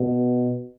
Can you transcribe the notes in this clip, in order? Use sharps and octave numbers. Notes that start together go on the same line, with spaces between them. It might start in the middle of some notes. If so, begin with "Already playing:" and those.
Already playing: B2